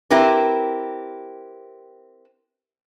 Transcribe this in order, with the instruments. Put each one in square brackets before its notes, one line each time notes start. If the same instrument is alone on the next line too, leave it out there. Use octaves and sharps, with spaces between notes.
[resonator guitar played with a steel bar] C4 E4 G4 A#4 B4